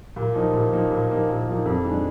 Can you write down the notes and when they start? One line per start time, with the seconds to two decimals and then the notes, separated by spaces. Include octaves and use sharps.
0.16 A#2
0.34 F3 A#3 D#4
0.53 A#2
0.72 F3 A#3 D#4
0.91 A#2
1.10 F3 A#3 D#4
1.29 A#2
1.48 F3 A#3 D#4
1.66 F2
1.84 D#3 G#3 D4